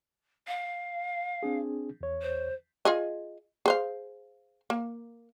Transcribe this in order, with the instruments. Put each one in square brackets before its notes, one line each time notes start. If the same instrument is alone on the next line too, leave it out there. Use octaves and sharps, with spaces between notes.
[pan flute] F5
[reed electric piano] C4 D4 G#4
E2 C#5
[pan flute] C5
[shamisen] F4 G#4 D#5
G#4 C5 F5
A#3